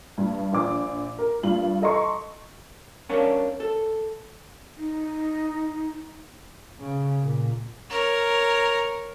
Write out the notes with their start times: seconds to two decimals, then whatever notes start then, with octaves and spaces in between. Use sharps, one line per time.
0.18 G2
0.53 A#1 D6
1.18 A#4
1.43 G2 F4 F#7
1.82 A4 D#5 A#5 C6 C#6
3.09 C#4 D4 A#4 C#5 D5 F5
3.60 A4
4.78 D#4
6.80 C#3
7.20 A#2
7.90 A#4 C#5